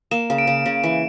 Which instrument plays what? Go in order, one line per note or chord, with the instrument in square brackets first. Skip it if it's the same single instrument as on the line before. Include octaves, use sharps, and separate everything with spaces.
[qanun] A#3 [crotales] E7
[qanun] C#3
[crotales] D7
[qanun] C#3
C#3
E3